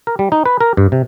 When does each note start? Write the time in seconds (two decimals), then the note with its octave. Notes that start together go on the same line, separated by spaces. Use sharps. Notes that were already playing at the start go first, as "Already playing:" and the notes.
0.07 A#4
0.19 G3
0.32 D#4
0.46 B4
0.61 A#4
0.77 G2
0.92 C3